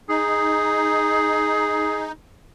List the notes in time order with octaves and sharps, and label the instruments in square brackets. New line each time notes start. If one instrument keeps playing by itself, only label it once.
[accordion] D#4 [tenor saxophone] G#4